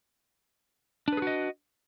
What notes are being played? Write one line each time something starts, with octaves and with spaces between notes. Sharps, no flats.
D4 F#4 G#4 B4 D#5